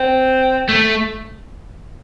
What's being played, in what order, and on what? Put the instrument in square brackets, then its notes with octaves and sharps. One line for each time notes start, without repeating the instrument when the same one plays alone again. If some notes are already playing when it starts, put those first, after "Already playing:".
Already playing: [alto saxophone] C4
[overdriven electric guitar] A3